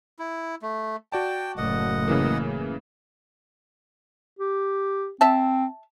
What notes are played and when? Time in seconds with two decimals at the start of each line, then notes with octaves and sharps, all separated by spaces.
0.19 E4
0.62 A3
1.12 F#4 D5 G5 A5
1.57 F#1 A2 D#5 F#5
2.08 C#3 E3 A#3
4.39 G4
5.21 C4 E5 A5